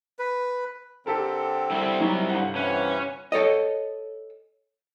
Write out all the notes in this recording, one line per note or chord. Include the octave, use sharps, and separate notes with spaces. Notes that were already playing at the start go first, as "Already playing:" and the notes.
B4
D3 C4 G4 A4 A#4
C3 G3 E4
F#3 D#4
G1 F#5
C3 E3 C#4 B4
A4 C#5 D#5